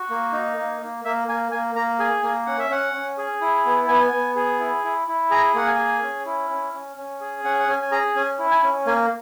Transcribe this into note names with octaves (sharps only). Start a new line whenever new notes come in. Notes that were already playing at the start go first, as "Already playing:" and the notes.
Already playing: F#4
A#3
D#4
A#3
A#3
A#3 E5
A#3 G#5
A#3 G#5
A#3 A#5
G#4 G#5
A#3 G#5
C#4 F#5
E5
C#4 F#5
C#4
G#4
E4
B3
B3 G#5
B3
G#4
E4
E4
E4
G#4 A#5
A#3 F#5
G#5
G#4
C#4
E4
C#4
C#4
C#4
G#4
C#4 F#5
F#5
C#4 G#5
G#5
G#4 A#5
C#4 G#5
E4
G#5
C#4
A#3 G#5